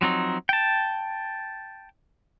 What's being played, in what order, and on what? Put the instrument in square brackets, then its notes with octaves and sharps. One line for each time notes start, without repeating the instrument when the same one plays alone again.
[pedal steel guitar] F3 F#3 C4 D#4
G5 A5